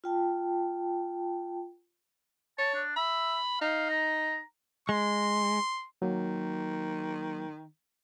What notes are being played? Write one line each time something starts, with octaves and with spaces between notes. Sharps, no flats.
F4 G5 A5
C#5 A5
D4
E5 B5
D#4 F5
A#5
G#3 C6
D#3 F#3 A#3